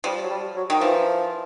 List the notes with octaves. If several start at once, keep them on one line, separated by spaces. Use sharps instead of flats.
F3 G3
F#3
G3
F#3
D#3
E3 F3